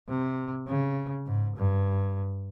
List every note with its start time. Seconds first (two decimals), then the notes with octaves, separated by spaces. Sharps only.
0.09 C3
0.68 C#3
1.27 G#2
1.56 G2